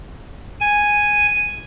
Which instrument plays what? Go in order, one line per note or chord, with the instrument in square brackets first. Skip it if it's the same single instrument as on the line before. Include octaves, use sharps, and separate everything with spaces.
[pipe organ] G#5